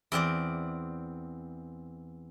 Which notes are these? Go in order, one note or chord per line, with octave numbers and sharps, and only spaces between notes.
E2 C4 D5